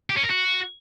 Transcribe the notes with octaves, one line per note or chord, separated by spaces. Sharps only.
G4
C#4
A#4
F#4